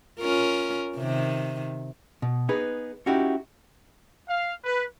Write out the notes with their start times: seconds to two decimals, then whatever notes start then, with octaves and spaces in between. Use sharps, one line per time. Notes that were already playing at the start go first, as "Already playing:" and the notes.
0.20 C#4 F4 A#4
0.97 C3 D#3
2.22 B2
2.49 B3 D#4 G#4 B4
3.06 C#4 D#4 E4 F#4 G4
4.27 F5
4.65 B4